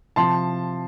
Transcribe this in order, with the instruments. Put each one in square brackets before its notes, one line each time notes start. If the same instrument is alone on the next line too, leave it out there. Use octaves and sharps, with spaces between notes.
[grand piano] C3 F3 A5 C6